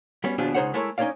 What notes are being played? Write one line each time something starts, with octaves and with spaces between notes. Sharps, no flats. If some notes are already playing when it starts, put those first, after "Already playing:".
G3 B3 C#4 F#4
D#2 B2 F3 D4 F4 G#4
C#2 D#4 G#4 C5 C#5 F#5
G#3 A3 E4 A#4 C#5
C#4 D#4 F#4 C#5 D5 F5